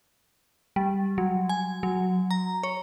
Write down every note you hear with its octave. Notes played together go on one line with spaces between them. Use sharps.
G3
F#3
G#5
F#3
A#5
C#5